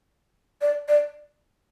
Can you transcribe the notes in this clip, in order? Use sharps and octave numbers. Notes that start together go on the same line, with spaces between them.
D5
D5